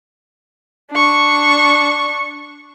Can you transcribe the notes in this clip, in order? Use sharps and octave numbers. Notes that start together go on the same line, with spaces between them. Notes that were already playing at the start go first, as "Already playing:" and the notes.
D4 C#6